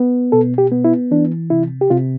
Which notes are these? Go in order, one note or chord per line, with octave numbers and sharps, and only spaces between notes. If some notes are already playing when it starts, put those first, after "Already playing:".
Already playing: B3
B2 A4
G4
B3
E4
E3 D4
C3 E4
G4
C3 F4